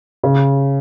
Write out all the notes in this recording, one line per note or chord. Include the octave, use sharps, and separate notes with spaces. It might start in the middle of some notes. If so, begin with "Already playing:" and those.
C#3